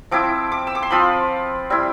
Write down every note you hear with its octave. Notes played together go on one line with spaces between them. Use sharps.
F3 C4 E4 D6
D6
E6
D6
C6
F3 C4 F4 B5
G3 C4 E4